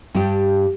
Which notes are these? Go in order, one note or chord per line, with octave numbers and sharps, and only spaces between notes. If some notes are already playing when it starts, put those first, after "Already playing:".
G2 G3 D4 G4